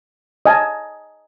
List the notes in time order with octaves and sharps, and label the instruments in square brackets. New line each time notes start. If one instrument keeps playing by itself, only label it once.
[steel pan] D#5 G#5 A5